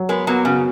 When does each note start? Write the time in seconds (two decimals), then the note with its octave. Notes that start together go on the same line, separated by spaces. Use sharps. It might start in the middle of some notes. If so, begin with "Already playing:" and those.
Already playing: F#3
0.09 G#3 B3 A#4
0.27 F#3 A#3 B3
0.45 C#3 F#4